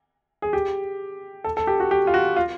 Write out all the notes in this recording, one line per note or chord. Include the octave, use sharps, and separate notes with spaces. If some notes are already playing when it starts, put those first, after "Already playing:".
G#4
G4
A4
A4
G4
F#4
G4
F4
F#4
F4